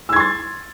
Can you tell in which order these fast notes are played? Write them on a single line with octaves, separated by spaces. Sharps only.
E6 G#6 C6 A6